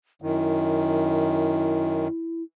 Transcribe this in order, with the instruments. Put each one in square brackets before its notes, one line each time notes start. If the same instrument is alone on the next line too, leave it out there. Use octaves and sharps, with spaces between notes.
[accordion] F#2 D#3 [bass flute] E4